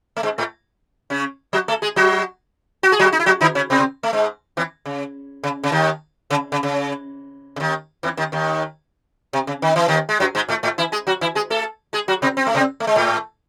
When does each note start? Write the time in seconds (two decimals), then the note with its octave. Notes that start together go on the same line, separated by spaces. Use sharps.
0.17 A3
0.23 G#2 G#3
0.38 A2 A3
1.10 C#3 C#4
1.53 F#3 F#4
1.68 A3 A4
1.82 G#3 G#4
1.96 F#3 F#4
2.83 F#4
2.92 G#4
2.99 F#3 F#4
3.12 D#4
3.20 E4
3.26 F#3 F#4
3.41 D#3 D#4
3.55 C#3 C#4
3.70 C3 C4
4.03 A3
4.13 G#2 G#3
4.57 E2 E3
4.85 C#3
5.43 C#3
5.64 C#3
5.72 D#2 D#3
6.30 C#3
6.52 C#3
6.63 C#3
7.56 C#3
7.60 D#2 D#3
8.03 E2 E3
8.17 D#2 D#3
8.32 D#2 D#3
9.33 C3
9.47 C#3
9.62 D#3
9.76 E3
9.88 D#2 D#3
10.09 G#3
10.20 F#2 F#3
10.35 G#2 G#3
10.49 A2 A3
10.63 A2 A3
10.78 E3 E4
10.92 G#3 G#4
11.07 F#3 F#4
11.21 E3 E4
11.35 G#3 G#4
11.50 A3 A4
11.93 G#3 G#4
12.08 F#3 F#4
12.22 C3 C4
12.37 C4
12.47 A3
12.55 C3 C4
12.80 A3
12.87 G#3
12.95 A2 A3